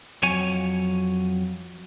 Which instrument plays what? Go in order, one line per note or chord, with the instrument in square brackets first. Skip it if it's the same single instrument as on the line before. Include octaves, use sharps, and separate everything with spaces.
[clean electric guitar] F2 F#3 C#5 G#5